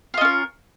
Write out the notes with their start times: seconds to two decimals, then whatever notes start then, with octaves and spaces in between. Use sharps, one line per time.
0.14 F4
0.17 D#5
0.21 C#4
0.25 A#4